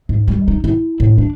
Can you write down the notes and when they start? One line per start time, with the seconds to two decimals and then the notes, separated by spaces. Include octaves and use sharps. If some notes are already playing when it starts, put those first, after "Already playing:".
0.09 G#2
0.28 G3
0.48 D#4
0.64 E4
1.00 A2
1.18 D4